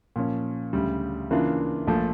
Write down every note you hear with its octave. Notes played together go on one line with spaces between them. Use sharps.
A#2 F3 C#4
D2 C#3 G3
C#3 E3 A#3 D4 F4
A#1 A#2 F3 A3